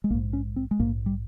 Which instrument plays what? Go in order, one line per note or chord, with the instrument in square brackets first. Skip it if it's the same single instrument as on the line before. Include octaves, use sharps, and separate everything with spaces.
[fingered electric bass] G#3
A#1 A#3
G#2
C#4
C4
G#3
A#1 G#2 A#3
G3